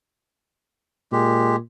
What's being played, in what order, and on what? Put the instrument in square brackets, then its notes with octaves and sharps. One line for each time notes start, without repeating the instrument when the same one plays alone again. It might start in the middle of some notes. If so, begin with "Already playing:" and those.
[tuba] A#2 [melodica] G#3 G4